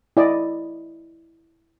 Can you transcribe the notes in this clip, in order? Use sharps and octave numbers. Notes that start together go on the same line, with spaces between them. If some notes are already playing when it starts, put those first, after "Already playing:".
E4 D5 D#5